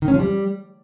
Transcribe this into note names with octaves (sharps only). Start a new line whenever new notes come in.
D#3
C#4
F3
G3